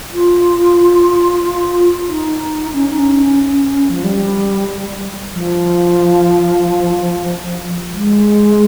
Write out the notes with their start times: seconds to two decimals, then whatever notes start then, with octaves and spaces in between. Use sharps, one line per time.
0.14 F4
2.09 D#4
2.74 C#4
2.87 D#4
2.99 C#4
3.90 F3
4.04 G3
5.34 F3
7.94 G#3